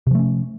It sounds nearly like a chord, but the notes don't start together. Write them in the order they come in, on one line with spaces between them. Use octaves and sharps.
C3 F3 A3 C#4